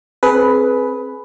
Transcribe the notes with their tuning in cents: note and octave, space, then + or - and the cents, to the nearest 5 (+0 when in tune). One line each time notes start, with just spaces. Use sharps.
C4 +10 G#4 +25 B4 +0